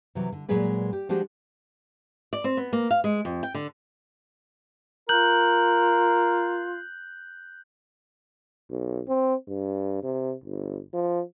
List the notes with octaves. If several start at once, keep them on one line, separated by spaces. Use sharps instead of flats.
C3 E3 F#3
D3
A#2 F#3 G#3 G#4 B4 D5
G4
F3 G#3 D4 F#4 G4 C5
D5
C4
B3
A#3
F5
G#3
F2
G5
D3
F4 A#4 F#6 G6 F#7
B1
C4
G2
C3
G1
F3